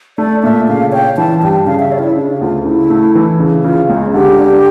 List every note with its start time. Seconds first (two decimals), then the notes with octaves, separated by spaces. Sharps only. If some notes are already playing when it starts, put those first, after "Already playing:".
0.18 A3 D5
0.43 A#2 E5
0.68 C#3 F5
0.92 C#4 G5
1.17 E3 A5
1.42 G2 G5
1.66 C#3 F5
1.79 E5
1.91 C#4 D5
1.98 F4
2.03 E4
2.16 C#3 D4
2.35 G4
2.41 D2 F4
2.65 C#3 E4
2.90 A3
3.15 E3
3.39 C#3
3.64 C#3 F4
3.89 C#2 C#4
4.13 D3 G4
4.39 D4